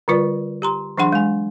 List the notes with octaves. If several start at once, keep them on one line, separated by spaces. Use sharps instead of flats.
D3 G3 F4 B4 D5
G4 A#5 C6
E3 F#3 D4 G#4 F#5 C6
G#3 G#5